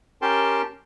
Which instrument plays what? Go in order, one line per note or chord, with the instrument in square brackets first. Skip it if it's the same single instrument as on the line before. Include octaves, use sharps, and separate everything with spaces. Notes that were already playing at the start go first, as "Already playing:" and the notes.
[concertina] C#4 G4 A#4 G5 A5 C6